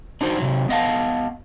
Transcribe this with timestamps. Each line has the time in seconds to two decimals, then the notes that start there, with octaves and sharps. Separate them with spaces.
0.21 D4 D#4 F#4 C5
0.38 C3 F#3
0.69 B3 D#5 F5 A5